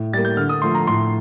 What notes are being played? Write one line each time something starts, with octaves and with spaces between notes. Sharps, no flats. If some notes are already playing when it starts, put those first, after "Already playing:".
Already playing: A2
G3 A#3 A6
G6
D3 F6
D#6
F3 A3 C6
A#5
A2 C6